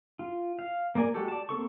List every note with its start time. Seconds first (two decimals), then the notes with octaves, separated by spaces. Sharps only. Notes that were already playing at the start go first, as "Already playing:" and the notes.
0.19 F4
0.59 F5
0.95 A#3 A#4 D5 G#5
1.14 G#3 F#4 G4 A4
1.28 D5 A5
1.49 A#3 C4 A4 C#6